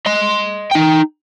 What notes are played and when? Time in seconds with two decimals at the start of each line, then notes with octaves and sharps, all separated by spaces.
0.06 D#5 C6
0.72 D#4 G5